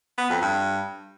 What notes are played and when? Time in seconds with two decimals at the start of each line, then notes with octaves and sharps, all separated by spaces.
0.18 B3
0.30 F2
0.41 G2